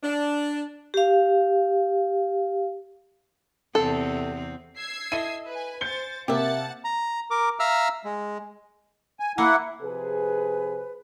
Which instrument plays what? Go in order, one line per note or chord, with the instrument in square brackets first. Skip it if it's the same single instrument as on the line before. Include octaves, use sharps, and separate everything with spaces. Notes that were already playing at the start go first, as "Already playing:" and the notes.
[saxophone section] D4
[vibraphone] G4 F5
[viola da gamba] E2 C3 C4 [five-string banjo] A4
[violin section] E6 G#6 C7
[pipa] E4 A4 D#5 [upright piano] D#7
[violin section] B4 G#5
[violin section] C5 A6 [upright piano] G6 C#7 G7
[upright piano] C3 A#3 [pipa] G4 E5 [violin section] F#5 A5 A6
[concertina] A#5
A#4 D6
E5 F5 A#5 E6 F6
G#3
[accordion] G#5
[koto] A#3 [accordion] E4 F#5
[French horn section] C3 F3 G#4 [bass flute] B4